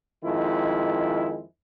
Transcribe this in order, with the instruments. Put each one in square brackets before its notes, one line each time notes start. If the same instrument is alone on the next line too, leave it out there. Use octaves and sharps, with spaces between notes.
[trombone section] F2 D#3 G#3 E4